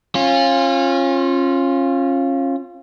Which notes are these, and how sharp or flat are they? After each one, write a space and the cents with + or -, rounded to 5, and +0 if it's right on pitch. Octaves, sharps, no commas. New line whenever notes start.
C#4 -30 F4 +0